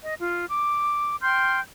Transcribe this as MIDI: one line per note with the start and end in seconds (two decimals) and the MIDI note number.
0.02 0.14 75
0.20 0.45 65
0.50 1.15 86
1.22 1.60 79
1.22 1.60 84
1.22 1.60 89
1.22 1.60 91